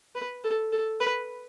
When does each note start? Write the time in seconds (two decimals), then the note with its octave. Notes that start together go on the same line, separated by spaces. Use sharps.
0.15 B4
0.44 A4
0.72 A4
1.00 B4